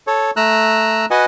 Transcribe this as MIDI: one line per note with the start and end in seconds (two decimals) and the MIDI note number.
0.07 0.31 69
0.07 0.31 73
0.36 1.06 57
0.36 1.06 82
0.36 1.06 88
0.36 1.06 90
1.11 1.26 66
1.11 1.26 71
1.11 1.26 75
1.11 1.26 78
1.11 1.26 80